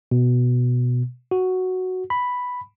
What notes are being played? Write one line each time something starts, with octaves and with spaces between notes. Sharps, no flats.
B2
F#4
B5